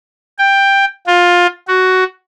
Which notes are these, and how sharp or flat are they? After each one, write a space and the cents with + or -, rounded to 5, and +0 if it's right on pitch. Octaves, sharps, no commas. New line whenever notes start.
G5 +10
F4 +15
F#4 +10